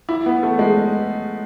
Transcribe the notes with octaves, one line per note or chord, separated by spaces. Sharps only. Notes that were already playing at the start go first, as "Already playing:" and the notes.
E4
B3
A3
G#3